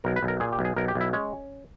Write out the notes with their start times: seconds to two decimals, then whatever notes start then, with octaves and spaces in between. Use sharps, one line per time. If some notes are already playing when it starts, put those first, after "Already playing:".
0.04 B1 A#4
0.16 B4
0.23 B1
0.28 A#4
0.40 A#2 G#4
0.52 G4
0.59 B1
0.65 G#4
0.76 B1 A#4
0.88 G4
0.95 B1
1.01 E4
1.13 G#3 C#4